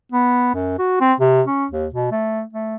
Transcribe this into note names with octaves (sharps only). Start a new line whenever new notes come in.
B3
F#2
F#4
C4
C3
C#4
D#2
B2
A3
A3